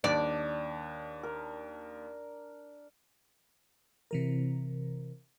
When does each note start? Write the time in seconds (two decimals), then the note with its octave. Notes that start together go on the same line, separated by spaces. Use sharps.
0.04 D#2 D4 D5
1.23 A#4
4.11 C3 E3 A#4